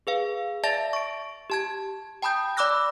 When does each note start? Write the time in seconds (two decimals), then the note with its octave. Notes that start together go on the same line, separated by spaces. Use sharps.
0.07 G#4 B4 F5
0.63 D5 E5 A5 A6 A#6
0.93 C#6 D7
1.50 G4 A5 G#6
2.22 G5 A5 B5 D#6 G6
2.57 D5 B5 D6 E6 F#6 A#6